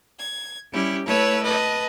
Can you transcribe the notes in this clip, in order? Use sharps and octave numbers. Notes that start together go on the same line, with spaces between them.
G#6
G3 C#4 E4 G4
A3 E4 B4 C#5 A5 E6
B4 D#5 A5